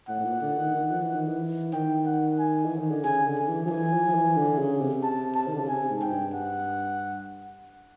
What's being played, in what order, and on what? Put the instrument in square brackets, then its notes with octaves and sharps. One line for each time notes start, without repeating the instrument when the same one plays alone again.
[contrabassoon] A2 [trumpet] F#5
[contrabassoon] A2
A#2
D3
D#3
D#3
F3
E3
D#3
E3
[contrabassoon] D#3 [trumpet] G5
[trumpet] F#5
G#5
[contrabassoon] E3
D#3
D3
[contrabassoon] C#3 [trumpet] G#5
[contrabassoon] D3
[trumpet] G#5
[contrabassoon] E3
F3
[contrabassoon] E3 [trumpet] G#5
[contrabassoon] F3
F3
E3
D3
C#3
C3
[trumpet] A5
A5
[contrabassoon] D#3
D3
C#3
[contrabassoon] C3 [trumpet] G#5
[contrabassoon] G#2
[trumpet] G5
[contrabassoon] G2
[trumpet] F#5